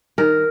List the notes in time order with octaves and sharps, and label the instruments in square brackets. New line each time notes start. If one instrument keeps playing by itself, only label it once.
[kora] D#3 A#4